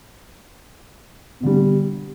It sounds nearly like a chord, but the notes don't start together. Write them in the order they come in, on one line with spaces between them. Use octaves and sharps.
B2 D3 G3